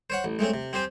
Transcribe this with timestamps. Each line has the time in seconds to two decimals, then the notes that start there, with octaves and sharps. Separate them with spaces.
0.10 C5 C#5 F#5
0.24 A1
0.39 G#3 A3 C4 C#4
0.54 C3
0.73 C4 G4 C5 G#5